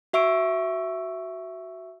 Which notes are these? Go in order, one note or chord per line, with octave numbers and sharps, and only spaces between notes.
F#4 E5 C#6 E6 D7